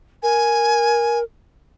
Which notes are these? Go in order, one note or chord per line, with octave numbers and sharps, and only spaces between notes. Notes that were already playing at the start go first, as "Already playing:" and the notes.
A#4 G#5